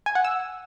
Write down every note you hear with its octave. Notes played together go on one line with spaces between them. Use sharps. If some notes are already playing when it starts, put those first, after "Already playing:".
G#5
F#5
E6